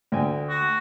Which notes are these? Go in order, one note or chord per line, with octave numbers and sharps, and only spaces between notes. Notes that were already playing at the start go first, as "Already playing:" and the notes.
D2 G5 G#5
F#4